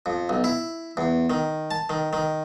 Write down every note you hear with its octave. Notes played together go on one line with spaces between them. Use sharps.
F2
B1
E4
E2
D#3
A5
D#3
D#3